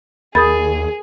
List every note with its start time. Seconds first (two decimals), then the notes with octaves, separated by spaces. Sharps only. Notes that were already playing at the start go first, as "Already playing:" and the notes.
0.35 D#2 G#4 A#4 B5 D#6 A6